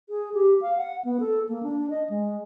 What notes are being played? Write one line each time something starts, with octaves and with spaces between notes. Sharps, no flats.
G#4
G4
F5
F#5
B3
A4
A#3
D4
D#5
G#3